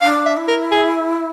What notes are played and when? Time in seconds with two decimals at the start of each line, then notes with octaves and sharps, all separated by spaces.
0.02 D4 F5
0.26 E5
0.37 E4
0.48 A#4
0.72 G#4